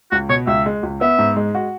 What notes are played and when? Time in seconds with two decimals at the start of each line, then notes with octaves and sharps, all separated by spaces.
0.12 C#2 F#4
0.29 B2 C#5
0.47 C#2 E5
0.66 G#3
0.83 C#2
1.01 B3 E5
1.19 G#2
1.36 G#3
1.55 F#4